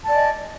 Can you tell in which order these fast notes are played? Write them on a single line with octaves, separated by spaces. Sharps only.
A5 D5 G#5 D#5